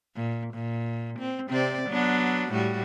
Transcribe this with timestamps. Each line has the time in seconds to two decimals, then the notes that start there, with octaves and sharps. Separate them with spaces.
0.16 A#2
0.55 A#2
1.19 C4
1.49 C3 C4 D5
1.90 F#3 B3 D4
2.53 A2 G3 F#4